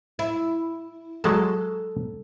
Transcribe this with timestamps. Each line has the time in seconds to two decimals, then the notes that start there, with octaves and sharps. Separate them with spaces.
0.19 E4
1.24 F#3 G#3 A4 A5